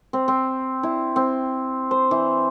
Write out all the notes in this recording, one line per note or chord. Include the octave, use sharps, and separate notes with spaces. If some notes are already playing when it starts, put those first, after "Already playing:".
C4
C4
E4
C4
C5
E3